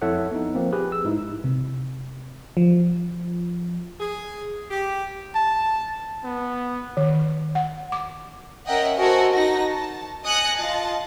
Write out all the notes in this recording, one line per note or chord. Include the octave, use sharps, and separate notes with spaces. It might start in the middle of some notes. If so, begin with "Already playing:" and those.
F2 E4 A4 C#5 E5 F#5
B3 D#4
F3 A#3 C4
G4 G#4 B4
E6
G#2 D#4 E4
C3
F3
G#4
G4
A5
B3
D#3
F#5
D6
C#4 A#4 D#5 E5 F#5 G5
F#4 A4 A#4 C5 D#5 G#5
D#4 F#4 A#6
A5
D#5 G#5 D#6 F#6 A#6 C#7
F4 D#5 A5